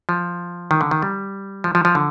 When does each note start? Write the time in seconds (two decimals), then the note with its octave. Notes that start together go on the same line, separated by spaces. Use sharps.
0.09 F3
0.71 D#3
0.81 D3
0.91 D#3
1.02 G3
1.64 F3
1.75 F3
1.85 F3
1.95 D3